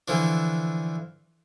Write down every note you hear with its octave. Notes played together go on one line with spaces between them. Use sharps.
D3 E3 F3 D4